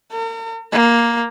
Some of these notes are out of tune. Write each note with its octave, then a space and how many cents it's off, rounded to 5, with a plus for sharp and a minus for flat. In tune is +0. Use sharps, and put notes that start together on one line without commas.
A#4 -45
A#3 +5